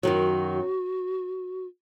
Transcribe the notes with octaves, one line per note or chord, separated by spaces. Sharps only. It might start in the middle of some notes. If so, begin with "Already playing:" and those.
F#2 D#3 F#3 F#4